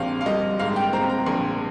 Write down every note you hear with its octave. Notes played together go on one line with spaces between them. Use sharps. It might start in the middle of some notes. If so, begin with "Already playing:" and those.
Already playing: A#1 G#2 C4 G4 F5
F5
G3 D#5
G#2 F5
G5
C4 A#5
A#5
A#1 C6